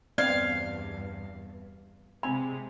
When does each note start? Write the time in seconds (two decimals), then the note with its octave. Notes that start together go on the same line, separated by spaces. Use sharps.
0.18 E2 G2 B3 C4 D4 D5 F5
2.23 C3 G#3 C4 G#5 B5